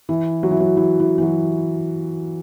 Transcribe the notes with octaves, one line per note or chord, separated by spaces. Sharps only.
E3
F#3
E3
F#3
E3
E3
E3
F#3